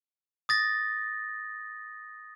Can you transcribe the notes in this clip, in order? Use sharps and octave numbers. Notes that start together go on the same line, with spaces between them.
D#6 A6 A#6